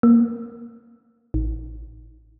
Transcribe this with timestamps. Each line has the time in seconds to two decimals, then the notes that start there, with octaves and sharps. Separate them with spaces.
0.03 A#3
1.34 A1